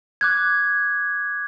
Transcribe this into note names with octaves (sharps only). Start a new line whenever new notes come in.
D6 F#6 G#6